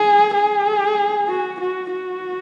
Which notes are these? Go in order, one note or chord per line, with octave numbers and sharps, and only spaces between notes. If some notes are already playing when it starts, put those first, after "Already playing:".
Already playing: G#4
G#4
F#4
F#4
F#4